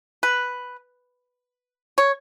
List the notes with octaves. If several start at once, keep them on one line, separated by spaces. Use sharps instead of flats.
B4
C#5